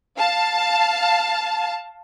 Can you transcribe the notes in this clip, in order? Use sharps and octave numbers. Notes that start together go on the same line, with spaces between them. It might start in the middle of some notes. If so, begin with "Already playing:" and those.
F5 A5